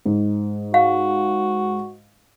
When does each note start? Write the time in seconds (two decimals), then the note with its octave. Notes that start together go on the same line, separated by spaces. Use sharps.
0.06 G#2
0.74 F#4 F5